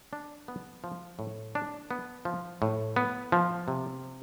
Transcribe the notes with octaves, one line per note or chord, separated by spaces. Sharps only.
D4
B3
F3
A2
D4
B3
F3
A2
B3
F3
C3